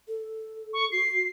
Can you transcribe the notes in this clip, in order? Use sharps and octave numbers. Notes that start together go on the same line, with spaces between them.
A4
C#6
F#4 C7